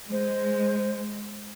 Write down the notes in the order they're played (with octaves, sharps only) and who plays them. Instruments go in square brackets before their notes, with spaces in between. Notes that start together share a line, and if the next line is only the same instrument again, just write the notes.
[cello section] G#3 [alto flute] C5